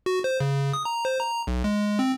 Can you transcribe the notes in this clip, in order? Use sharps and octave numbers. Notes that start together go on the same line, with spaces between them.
F#4
C5
C#3
D#6
A#5
C5
A#5
B1
G#3
C4